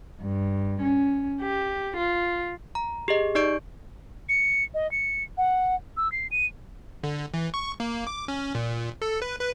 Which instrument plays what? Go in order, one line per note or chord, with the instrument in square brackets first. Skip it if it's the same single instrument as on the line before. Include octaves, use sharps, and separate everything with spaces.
[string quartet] G2
C#4
G4
F4
[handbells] A#5
G4 G#4 D#5
D#4 G4 D5 C#6 G6 D7
[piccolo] C#7
D#5
C#7
F#5
E6
C7
D#7
[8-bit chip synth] D3
E3
C#6
A#3
D6
C#4
A#2
A4
B4
B4